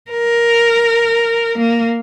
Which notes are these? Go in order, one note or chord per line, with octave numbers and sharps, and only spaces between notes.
A#4
A#3